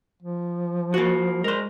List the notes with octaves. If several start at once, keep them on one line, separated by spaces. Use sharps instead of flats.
F3
A#3 F#4
G#3 A#4 C5